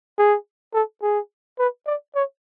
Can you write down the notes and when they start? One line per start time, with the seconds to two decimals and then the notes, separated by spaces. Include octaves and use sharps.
0.18 G#4
0.74 A4
1.02 G#4
1.59 B4
1.86 D5
2.15 C#5